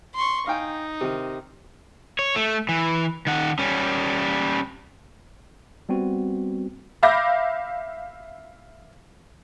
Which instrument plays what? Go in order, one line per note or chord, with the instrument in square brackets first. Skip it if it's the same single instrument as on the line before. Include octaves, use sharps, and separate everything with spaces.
[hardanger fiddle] C6 C#6
[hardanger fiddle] D#4 [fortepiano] F5 G5 G#5
[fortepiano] C3 D#3
[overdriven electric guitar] C#5
A3
E3
D#3 F#5
G3 C#4
[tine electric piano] G3 B3 C4 F#4
[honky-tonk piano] E5 F5 B5 D6 G6 A#6